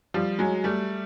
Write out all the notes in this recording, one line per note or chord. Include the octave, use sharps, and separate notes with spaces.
F3 G3
F#3 G#3
G3 A3